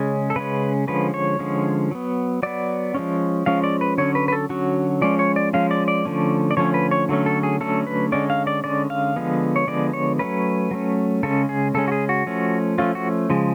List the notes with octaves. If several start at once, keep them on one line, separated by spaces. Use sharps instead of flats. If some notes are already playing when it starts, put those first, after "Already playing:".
Already playing: C#3 G#3 C#4
A4
C#3 G#3 C#4 B4
D3 F3 G#3 C#4 B4
C#5
D3 F3 G#3 C#4
F#3 B3
F#3 B3 D5
F3 G#3 C#4
F3 G#3 C#4 F5
D5
B4
D3 F#3 C#4 C#5
B4
B4
A4
D3 F#3 C#4 F#4
F3 G#3 C#4 D5
C#5
D5
F3 G#3 C#4 F5
D5
D5
D3 F3 A3 C#4
D5
D3 F3 A3 C#4 C#5
B4
C#5
D3 F#3 A3 C#4
A4
G#4
D3 F#3 A3 C#4 A4
B4
D3 G#3 C#4 D5
F5
D5
D3 G#3 C#4 D5
F5
D3 F3 G#3 B3
C#5
D3 F3 G#3 B3 D5
C#5
F#3 A3 C#4 B4
F#3 A3 C#4
C#3 G#3 C#4 A4
G#4
C#3 G#3 C#4 A4
F#4
G#4
F#4
F3 A3 C#4
F3 A3 C#4 F4
F#4
C#3 F3 G#3